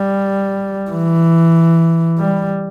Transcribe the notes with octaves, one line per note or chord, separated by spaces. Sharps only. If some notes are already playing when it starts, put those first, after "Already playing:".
Already playing: G3
E3
G3